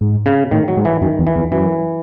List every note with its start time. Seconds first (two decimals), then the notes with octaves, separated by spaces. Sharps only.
0.01 G#2
0.26 C#3
0.51 A2 D#3
0.68 F#3
0.77 G#2
0.85 E3
1.01 F#2 D#3
1.19 E2
1.27 E3
1.36 E2
1.51 F#2 E3